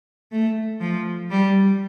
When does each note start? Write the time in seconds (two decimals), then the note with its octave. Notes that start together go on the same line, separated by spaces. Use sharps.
0.32 A3
0.81 F3
1.31 G3